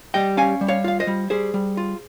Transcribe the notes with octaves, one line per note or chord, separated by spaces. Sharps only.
G3 D#5 G5
C#4 F5 G#5
G3
C#5 F5
F4 F5
C5 D#5
G3
G3 G#4 C5
G3
F4